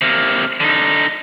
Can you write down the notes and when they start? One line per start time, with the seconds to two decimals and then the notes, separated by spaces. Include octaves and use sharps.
0.02 C3 A#3
0.60 D3 D#4